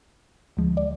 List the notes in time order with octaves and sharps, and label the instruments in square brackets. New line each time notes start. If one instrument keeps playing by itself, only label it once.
[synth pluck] D2 D3 F3 G#3
D5